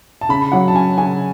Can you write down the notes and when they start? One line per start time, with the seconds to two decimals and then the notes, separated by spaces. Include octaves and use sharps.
0.21 A5
0.29 C#3 B5
0.52 F#3 F#5
0.68 A5
0.74 C#4 G#5
0.98 C#3 G#5